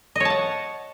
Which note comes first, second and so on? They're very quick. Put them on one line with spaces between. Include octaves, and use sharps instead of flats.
D#5 C#5 A5 F#5